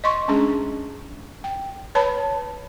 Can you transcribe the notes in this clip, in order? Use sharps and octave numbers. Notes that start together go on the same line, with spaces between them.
D#5 C6 C#6
G#3 C#4 D4 G#4
G5
B4 C#5 A5 B5